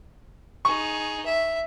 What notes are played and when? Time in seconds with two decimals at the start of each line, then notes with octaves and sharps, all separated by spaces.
0.65 D#4 G#4 C#6
1.26 E5